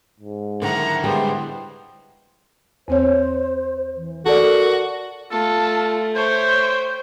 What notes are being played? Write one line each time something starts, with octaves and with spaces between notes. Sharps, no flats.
G#2
D3 D#3 E4 F#5 A#5
G3 G#3 B3 C5
E2 C4 C5 C#5
E3
F#4 A4 A#4 D5
A3 F4 A4 A5
C5 C#5 E5 G5